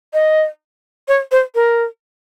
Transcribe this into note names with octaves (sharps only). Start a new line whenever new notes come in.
D#5
C#5
C5
A#4